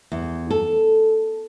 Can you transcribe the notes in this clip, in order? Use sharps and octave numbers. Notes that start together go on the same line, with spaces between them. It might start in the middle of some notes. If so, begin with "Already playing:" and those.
E2
A4